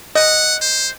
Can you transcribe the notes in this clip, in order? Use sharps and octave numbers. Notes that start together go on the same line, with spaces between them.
D#5 F#5
C5